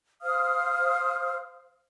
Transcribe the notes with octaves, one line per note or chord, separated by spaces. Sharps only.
C5 F5 D#6 F6